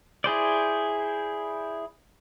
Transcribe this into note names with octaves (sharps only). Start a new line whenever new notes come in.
E4 G#4 C5 D5